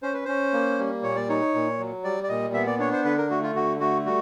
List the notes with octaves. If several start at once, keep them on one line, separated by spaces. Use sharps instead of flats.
C#4 C5
B4
C#4 C5
A#3
G3
A#2 C#5
D5
D#4 C#5
A#2
F#3
G3 D5
D5
A#2 D#5
B3 E5
D5
D4 C#5
C5
D3 B4
A#4
A3 F#4
F4
D3 F#4
A3 F#4
G3 F#4